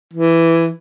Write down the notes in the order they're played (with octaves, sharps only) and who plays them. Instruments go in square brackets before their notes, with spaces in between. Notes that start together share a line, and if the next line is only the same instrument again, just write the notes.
[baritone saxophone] E3